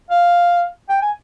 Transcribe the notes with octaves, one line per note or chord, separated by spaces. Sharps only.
F5
G5
G#5